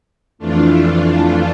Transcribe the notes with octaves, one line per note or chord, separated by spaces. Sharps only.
F2 E3 A3 D4 F4